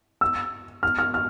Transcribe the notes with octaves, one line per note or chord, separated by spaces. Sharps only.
E6
F6
F6
F6